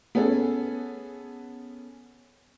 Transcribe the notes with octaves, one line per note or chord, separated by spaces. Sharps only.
B3 C#4 G#4 A4